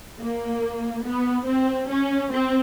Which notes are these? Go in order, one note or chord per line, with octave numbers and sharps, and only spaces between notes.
A#3
B3
C4
C#4
C4